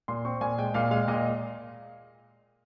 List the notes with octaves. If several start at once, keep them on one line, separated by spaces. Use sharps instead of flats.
A#2 C6
C4 C#6
A#2 G#5
G#3 G5
A#2 F5
G#3 F5
A#2 D#5